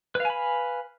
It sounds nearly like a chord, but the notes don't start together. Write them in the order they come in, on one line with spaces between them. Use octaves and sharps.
B4 F5 G#5 B5